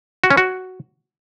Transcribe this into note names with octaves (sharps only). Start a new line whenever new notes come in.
F#4
C#4
F#4